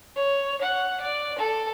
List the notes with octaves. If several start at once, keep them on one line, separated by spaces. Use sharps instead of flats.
C#5
F#5
D5
A4